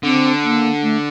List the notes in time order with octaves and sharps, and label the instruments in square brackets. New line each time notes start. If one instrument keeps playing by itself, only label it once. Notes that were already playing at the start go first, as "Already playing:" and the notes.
[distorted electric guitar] D3 [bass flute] C4
[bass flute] A#3
A3